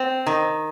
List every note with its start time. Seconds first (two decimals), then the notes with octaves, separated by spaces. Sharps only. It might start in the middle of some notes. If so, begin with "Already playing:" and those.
Already playing: C4
0.26 D#3